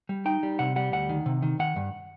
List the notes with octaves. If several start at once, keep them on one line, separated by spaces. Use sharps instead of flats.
G3
D#4 G5
G3
C3 F#5
G3 F#5
D2 F#5
D#3
C3
D#3
D#3 F#5
G2